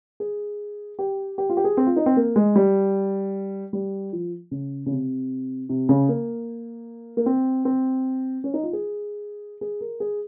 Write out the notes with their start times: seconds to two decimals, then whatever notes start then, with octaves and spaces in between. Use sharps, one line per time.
0.20 G#4
0.99 G4
1.38 G4
1.50 F4
1.57 G4
1.64 G#4
1.77 C4
1.87 F4
1.96 D#4
2.06 C4
2.17 A#3
2.36 G#3
2.56 G3
3.73 G3
4.13 F3
4.51 C#3
4.86 C#3
4.91 C3
5.69 C3
5.89 C#3
6.09 A#3
7.17 A#3
7.26 C4
7.65 C4
8.44 C#4
8.54 D#4
8.63 F4
8.73 G#4
9.61 G#4
9.81 A#4
10.00 G#4